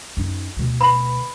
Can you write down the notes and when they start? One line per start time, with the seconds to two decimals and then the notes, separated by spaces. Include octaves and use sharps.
0.17 F#2 D#4
0.57 D2 B2
0.80 B4 B5